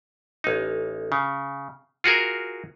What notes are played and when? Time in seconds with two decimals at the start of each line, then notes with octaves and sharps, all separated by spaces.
0.44 A1 D#4
1.12 C#3
2.04 F4 F#4 G#4 A#4